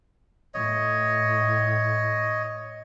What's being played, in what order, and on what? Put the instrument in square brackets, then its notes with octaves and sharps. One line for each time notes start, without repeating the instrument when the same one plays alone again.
[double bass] A2 [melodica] C#5 D#5